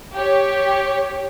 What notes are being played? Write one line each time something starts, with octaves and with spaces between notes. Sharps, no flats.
G4 C#5